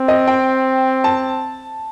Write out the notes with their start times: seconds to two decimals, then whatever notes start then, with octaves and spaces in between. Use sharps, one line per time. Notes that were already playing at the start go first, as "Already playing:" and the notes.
Already playing: C4
0.08 D#5
0.28 G5
1.04 A5